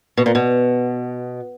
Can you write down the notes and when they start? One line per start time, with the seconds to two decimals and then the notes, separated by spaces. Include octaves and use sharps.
0.17 B2
0.26 A#2
0.35 B2